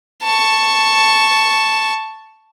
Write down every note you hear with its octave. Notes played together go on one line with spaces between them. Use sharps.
A5 C#6